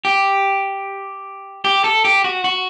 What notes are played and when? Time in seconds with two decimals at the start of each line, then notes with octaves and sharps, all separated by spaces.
0.05 G4
1.65 G4
1.84 A4
2.05 G4
2.24 F#4
2.44 F#4